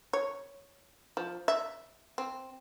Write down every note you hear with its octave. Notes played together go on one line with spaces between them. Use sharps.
C#5
F3
E5
C4